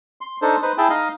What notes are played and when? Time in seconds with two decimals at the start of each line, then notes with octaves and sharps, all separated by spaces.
0.21 C6
0.42 D4 D#4 A4 C5
0.62 D#4 B4 C5
0.78 E4 G#4 E5 G5 A5
0.90 D#4 D#5 F5